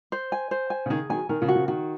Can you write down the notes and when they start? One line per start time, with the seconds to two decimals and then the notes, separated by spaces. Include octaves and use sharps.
0.12 C5
0.32 G#5
0.51 C5
0.70 G#5
0.86 C#3
0.90 D#3 G#4
1.10 D#3 F#3 G#5
1.29 D#3 A#4
1.41 C#3 F3
1.48 F#4
1.55 C#3 F3
1.68 D#3 F#4